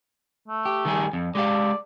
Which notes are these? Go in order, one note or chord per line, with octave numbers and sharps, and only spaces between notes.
A3
G4
D#3 G3 G#4
F2
G#3 G4 D5 F5